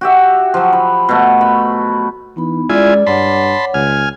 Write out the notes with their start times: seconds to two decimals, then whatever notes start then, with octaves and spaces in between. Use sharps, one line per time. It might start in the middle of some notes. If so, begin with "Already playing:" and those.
0.01 F#4 G4 E5
0.54 F3 F#3
0.73 B5
1.09 B2 A3
1.41 B5
2.37 E3 B3 D#4 B5
2.70 G#3 C#4 E4 F4 D5 G#5
3.07 G2 C#5 F#5 A5 B5 C6 D6
3.74 C#2 G#5 F6